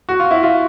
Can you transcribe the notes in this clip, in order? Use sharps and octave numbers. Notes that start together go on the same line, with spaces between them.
F#4
F4
E4
F4